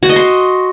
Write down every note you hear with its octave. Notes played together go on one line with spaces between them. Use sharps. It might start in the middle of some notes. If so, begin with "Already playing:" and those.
F#4
D#5
C6